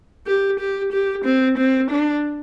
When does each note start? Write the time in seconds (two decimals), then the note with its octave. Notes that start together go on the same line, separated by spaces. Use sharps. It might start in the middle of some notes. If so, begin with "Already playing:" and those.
0.27 G4
0.59 G4
0.92 G4
1.25 C4
1.58 C4
1.90 D4